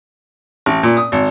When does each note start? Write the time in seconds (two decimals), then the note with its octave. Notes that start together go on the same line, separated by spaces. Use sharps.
0.66 A1
0.83 A#2
0.97 D#6
1.12 G#1